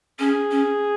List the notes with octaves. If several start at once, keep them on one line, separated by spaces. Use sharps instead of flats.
C#4 G#4
C#4